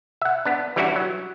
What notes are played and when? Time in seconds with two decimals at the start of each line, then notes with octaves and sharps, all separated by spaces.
0.21 E5 F#5
0.45 B3 D4
0.76 E3 G3 C#4 D4 E4 F#4
0.96 F#3